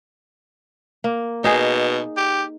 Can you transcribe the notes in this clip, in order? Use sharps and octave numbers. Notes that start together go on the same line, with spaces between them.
A#3
B2 D#4 G#4
G4